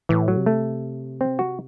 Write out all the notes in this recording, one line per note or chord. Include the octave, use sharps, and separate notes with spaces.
A2 E3
F#3
C3
A3
C4
F#4